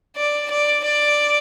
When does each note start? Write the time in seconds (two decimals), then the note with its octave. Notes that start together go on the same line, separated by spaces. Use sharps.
0.16 D5
0.50 D5
0.84 D5